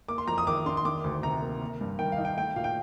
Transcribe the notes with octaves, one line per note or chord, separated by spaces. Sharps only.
A#3 D6
C6
F2 A#5
D#6
D#3 D6
D4 C6
C6
D#3 D6
D2
C3 A#5
A#3
A#3
G2
D#3 G5
F5
D#4
G5
A3 G5
A#2 F5
G5